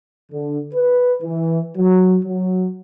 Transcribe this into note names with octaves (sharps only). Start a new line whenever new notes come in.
D3
B4
E3
F#3
F#3